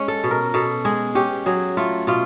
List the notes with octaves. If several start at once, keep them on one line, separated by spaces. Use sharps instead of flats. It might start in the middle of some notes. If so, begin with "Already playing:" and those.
Already playing: G#3 C#4
A4
B2
A#4
B2 A4
G#3 G#4
C#4 G4
F#3 G#4
A3 F4
B2 F4